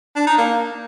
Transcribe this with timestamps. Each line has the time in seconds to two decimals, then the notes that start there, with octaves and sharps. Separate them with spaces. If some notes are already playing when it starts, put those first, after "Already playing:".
0.16 D4
0.27 D#4
0.38 A#3